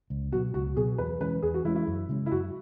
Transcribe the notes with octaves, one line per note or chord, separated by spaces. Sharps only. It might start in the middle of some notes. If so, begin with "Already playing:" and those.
C#2
B2 F#3 B3 F#4
C#2 F#4
B2 F#3 B3 G#4
E2 B4
E3 G#3 C#4 B4
E2 G#4
F#4
E3 G#3 C#4 E4
E4
F#2
C#3 G#3 C#4
E4
F#2 F#4